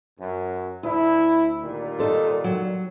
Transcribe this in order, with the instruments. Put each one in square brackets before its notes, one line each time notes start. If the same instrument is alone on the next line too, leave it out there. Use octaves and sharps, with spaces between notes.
[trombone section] F#2
[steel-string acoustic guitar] D2 [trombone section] E4
[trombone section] A#2 D#3 G3
[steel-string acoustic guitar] D#4 A4 C5
F#3